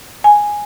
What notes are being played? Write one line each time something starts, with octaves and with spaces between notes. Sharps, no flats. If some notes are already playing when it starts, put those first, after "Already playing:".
G#5